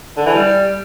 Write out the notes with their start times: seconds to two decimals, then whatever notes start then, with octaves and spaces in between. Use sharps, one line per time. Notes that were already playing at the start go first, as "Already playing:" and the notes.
0.17 D3
0.26 E3
0.35 G3